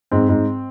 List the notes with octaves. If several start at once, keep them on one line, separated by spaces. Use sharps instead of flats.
G#2 C4
G#2